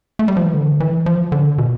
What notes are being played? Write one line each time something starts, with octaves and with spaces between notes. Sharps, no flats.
A3
G3
F3
E3
D3
E3
F3
D3
B2